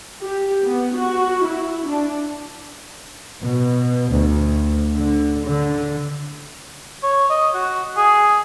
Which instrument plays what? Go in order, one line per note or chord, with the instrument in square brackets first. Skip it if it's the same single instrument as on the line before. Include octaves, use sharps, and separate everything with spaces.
[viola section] G4
B3
F#4
E4
D4
[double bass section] B2
D2
D3
D3
[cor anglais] C#5
D#5
F#4
G#4